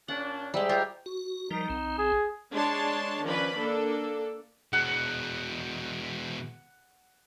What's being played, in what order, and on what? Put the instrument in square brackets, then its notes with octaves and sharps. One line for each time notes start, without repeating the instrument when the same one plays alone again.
[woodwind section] A#2 C#4 D4 [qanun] F#5
[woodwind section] G#2 E5 [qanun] G3 G#3
[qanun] F4 G4 A#4
[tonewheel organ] F#4
[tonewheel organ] F3 G3 A#4 [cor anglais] D#4
[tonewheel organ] B1 C4
[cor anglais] G#4
[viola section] G#3 D4 C#5 A5 C6
D#3 F3 C#4 B4 D5 B5
A#3 D4 A4
[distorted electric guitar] B2 G#3 [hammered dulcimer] F#5